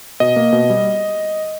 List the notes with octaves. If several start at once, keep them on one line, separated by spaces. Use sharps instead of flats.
B2 D#5
A#3
B2
G3